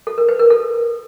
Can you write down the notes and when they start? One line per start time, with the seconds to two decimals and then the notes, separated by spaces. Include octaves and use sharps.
0.07 A4
0.18 A#4
0.29 B4
0.39 A#4
0.50 A4